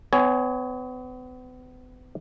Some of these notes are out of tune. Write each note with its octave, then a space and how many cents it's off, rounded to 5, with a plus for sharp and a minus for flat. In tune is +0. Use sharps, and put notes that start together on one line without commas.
B3 +40 C#5 +25 G#5 +0